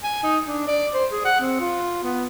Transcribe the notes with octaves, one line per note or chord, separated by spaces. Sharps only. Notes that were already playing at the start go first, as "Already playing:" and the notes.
G#5
D#4
D4
D5
C5
G#4
F#5
C4
F4
B3